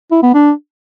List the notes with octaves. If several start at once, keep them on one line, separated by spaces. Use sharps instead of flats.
E4
B3
D4